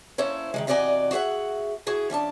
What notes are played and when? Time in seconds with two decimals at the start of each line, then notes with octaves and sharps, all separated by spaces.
0.18 A#3 C#4 E4 A4 C5 C#5
0.54 D#3 F3 G#3
0.67 E2 C3 F#4 D5 D#5 G#5
1.11 F#4 G#4 D5 E5 F#5
1.86 E4 F#4 G#4
2.10 F3 C#4 D4 A5